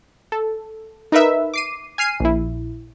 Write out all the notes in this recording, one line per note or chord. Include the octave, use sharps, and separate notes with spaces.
A4
D#4 A#4 B4 E5
D6 C7 D#7
G#5 F6 C7 D#7
A#1 E4